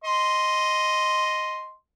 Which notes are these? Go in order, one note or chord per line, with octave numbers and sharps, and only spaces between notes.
D#5 C6